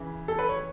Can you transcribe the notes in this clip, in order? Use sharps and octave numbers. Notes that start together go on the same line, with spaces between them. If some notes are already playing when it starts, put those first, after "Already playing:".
Already playing: C#3 E3
A4
B4
C#5